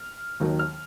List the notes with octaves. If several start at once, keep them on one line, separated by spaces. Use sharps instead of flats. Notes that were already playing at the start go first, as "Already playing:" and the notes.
Already playing: F6
D#2 D#3 F#3
F6